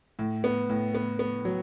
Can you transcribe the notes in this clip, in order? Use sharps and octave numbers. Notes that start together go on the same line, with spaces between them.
A2
B3
A2
B3
B3
F#3